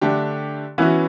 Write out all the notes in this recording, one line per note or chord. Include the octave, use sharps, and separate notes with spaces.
D3 A3 D4 G4
E3 B3 C#4 E4 F#4